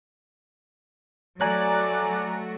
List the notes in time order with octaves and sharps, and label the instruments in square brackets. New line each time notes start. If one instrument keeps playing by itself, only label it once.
[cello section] F#3 A3 F#4 [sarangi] D5 [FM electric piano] G#5 A#5 F#6